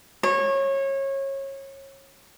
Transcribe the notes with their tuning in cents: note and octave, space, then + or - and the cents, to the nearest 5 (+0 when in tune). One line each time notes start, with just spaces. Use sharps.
C#5 -25